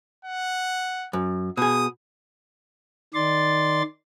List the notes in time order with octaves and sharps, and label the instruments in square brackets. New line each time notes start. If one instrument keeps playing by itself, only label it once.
[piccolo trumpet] F#5
[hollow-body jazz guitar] F#2
[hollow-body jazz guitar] B2 G#4 [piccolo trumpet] D#6
[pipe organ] D#3 D5 C6 A6